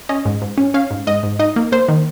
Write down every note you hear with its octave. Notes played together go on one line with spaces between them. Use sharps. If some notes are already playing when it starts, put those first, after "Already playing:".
C#4 D#5
G#2
G#2
C#4
C#4 F5
G#2
G#2 D#5
G#2
D#4 D#5
A#3
A#3 C5
D#3